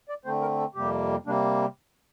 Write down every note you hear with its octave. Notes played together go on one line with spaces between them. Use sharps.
D5
D3 A3 C4 C5
A#4
A4
F2 C3 G3 A#3 G4
C3 G3 A#3 D4